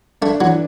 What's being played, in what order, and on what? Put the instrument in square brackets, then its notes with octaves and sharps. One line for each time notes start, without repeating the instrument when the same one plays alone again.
[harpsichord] A3 [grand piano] D4
[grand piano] E3 [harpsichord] F#3